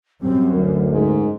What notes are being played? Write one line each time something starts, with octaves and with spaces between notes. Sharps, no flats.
F#2 G3 C4
D2 A#4
G#2